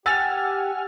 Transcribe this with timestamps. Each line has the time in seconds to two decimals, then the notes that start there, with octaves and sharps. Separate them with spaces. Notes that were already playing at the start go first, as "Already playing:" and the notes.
0.06 G4 F#5 G#5 E6 F6 A6